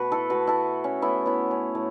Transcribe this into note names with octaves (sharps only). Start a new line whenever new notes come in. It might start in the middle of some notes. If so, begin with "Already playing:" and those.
Already playing: B2 A3 F#4 B4
E4 A4
B2 A3 F#4 B4
E4 A4
C#4
A2 A3 B3 E4
B3 E4
C#4
A2 A3